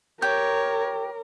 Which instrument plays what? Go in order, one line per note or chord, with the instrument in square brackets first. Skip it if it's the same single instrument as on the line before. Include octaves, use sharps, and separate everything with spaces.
[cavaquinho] G4 [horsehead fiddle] A#4 [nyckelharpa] C#5 [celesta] G6